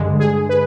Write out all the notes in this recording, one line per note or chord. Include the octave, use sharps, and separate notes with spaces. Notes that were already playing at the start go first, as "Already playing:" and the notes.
Already playing: G2 D3 G#3
G#4
B4